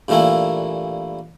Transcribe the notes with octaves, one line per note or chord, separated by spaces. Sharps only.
G2 A#2 E3 A3 A#3 E4